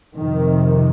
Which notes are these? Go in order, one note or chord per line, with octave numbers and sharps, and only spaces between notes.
F2 C3 D#3